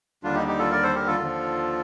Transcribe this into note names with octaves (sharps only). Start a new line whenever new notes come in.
D#2 D3 G3 D4 F4
D#4 G4
D#4 G4
F4 A4
A#4 D5
A4 C5
G4 A#4
F4 A4
D#2 D3 F3